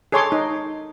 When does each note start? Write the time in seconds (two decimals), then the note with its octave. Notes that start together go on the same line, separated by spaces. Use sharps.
0.12 G#4 A4 C#5 G#5 C6 D6
0.32 D#4